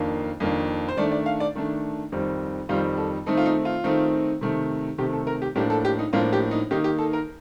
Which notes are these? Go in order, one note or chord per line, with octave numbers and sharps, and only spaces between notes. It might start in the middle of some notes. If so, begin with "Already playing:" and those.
Already playing: F2 D#3 A#3 D4
F2 D#3 A#3 D4
C5
D#3 A3 D4 D5
D5
F5
D5
D#3 A3 D4
F2 D#3 G3 C4
F2 D#3 G3 C4 F4
A4
D#3 A3 C4 D#4 A4
F4
D#4
F4
D#3 A3 C4 D#4
C3 D#3 A3
C3 D#3 A3 G4
A4
A#4
G4
A2 F3 A#3 D4 G4
A4
G4
D#4
A2 F3 A#3 D4 F4
G4
D#4
D#3 A#3 D#4 G4
G4
A4
A#4